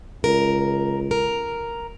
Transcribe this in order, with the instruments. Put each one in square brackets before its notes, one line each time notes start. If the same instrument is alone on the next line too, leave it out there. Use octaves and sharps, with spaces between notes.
[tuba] C#2 [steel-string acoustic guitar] A#4
[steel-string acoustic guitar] A#4